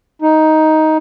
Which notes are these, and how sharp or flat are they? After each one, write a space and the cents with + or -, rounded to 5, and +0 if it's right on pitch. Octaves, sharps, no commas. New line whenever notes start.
D#4 +10